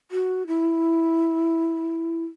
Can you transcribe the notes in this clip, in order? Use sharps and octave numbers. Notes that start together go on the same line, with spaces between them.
F#4
E4